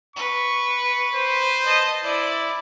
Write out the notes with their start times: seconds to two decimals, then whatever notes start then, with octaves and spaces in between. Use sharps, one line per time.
0.16 B4 C#6
1.15 C5
1.65 D#5 A5
2.04 E4 D5